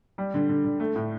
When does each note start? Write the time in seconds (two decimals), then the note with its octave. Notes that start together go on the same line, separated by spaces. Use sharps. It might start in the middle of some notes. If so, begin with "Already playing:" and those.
0.18 G3
0.34 D3
0.49 D3
0.64 D3
0.80 A3
0.95 A2